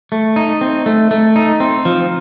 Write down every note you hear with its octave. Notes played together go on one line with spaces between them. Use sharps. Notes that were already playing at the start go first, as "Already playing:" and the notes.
A3
D#4
C4
A3
A3
D#4
C4
F3